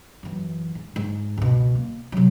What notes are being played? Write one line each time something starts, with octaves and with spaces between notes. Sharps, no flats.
F#2 E3
G#2
G#2
C#2 B2
A#3
C3 F#3